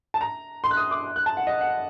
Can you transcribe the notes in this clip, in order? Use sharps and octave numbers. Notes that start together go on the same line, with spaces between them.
A5
A#5
C6
F#6
D#6
D6
F#6
A5
F#5
D#5
F#5